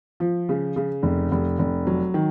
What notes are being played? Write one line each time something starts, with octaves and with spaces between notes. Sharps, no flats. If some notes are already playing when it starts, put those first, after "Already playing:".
F3
C#3
C#3
F1
F1
F1
F#3
D#3